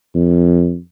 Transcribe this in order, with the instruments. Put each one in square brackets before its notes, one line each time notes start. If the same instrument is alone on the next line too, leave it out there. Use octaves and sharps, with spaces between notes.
[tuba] F2